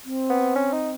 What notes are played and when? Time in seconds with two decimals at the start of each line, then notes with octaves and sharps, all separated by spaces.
0.05 C4
0.30 B3
0.56 C#4
0.72 D#4